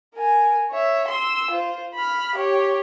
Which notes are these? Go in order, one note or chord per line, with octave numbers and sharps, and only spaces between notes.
A#4 G#5
C#5 E5
C6 E6
F4 C5
B5 F6
G4 C#5